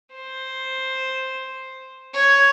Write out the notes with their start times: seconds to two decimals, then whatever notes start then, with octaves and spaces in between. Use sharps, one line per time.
0.12 C5
2.13 C#5